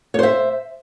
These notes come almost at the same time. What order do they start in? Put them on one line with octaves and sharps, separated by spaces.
C#5 C5 E5